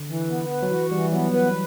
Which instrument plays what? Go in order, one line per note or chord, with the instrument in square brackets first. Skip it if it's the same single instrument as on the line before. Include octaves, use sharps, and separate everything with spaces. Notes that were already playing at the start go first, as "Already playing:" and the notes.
Already playing: [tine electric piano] D3
[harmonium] E3
B3
B4
[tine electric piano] F#3
[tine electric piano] E3 [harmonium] F#4
[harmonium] E3 [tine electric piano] G3
[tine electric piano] F#3 [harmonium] B3
[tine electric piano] E3 [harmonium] B4